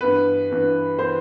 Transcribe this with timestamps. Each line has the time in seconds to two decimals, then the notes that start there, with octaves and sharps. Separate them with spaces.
0.01 G2 E3 B3 B4
0.50 G2 E3 B3
0.99 E3 B3 C5